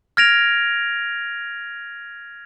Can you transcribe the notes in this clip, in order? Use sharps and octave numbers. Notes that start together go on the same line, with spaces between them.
F6 G#6 A#6 D7 F7